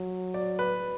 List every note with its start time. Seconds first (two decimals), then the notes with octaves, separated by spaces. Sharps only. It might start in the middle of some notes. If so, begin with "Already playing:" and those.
Already playing: F#3
0.34 D5
0.59 B4